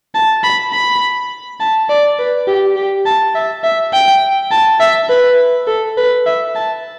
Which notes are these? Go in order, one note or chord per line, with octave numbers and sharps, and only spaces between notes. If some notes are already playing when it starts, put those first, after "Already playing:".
A5
B5
B5
A5
D5
B4
G4
G4
A5
E5
E5
G5
A5
E5
B4
A4
B4
E5
A5